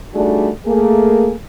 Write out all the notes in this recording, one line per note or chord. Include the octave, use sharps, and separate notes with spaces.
G3 A3 D4 D#4 F#4 G#4
A3 A#3 G#4